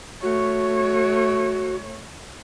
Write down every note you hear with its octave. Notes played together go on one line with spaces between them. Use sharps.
A3 F#4 C#5